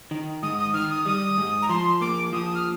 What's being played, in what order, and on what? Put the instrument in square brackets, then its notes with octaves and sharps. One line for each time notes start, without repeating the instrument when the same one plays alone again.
[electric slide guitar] D#3
[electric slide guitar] G#2 [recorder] D#6
[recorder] D#6
[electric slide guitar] D#3 [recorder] F6
[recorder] D#6
[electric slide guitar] G3 [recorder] D#6
[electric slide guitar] G#2
[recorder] A#5
[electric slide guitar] F3 [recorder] C6
[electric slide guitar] A#3 [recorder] D6
[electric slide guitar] F3 [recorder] D#6
[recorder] F6